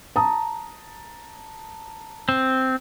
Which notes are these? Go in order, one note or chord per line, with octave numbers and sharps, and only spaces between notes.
A5 A#5 D#6
C4